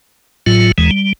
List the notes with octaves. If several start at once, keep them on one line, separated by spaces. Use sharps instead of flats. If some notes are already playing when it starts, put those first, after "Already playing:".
A2 F#3 F4
D#2 E3 G#3
G3